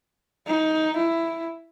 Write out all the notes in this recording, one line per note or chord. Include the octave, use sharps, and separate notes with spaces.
D#4
E4